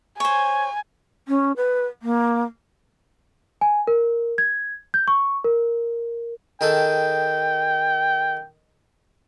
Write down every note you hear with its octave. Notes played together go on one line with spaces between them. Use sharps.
C5 C#5 G#5
C#4
B4
A#3
G#5
A#4
G#6
G6
C#6
A#4
D#3 G#4 A4 G5